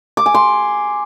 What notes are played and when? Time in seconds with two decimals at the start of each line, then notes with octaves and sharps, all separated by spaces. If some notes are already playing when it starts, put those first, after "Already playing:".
0.17 D6
0.26 G#5
0.34 C6